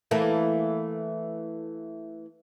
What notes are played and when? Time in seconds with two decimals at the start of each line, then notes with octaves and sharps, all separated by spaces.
0.11 E3 A3 A#3